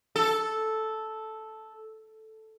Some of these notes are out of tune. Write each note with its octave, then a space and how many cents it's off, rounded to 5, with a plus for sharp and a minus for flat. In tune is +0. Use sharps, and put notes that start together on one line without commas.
A4 -5